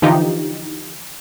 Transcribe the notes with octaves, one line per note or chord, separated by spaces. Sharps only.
D3 E3 F3 D#4 F4 G4